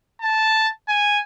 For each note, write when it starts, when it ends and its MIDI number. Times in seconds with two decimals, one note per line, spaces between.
0.22 0.68 81
0.88 1.20 80